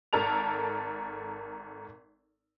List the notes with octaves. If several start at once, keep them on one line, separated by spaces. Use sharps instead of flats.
G#1 A4 A#4 A5 F7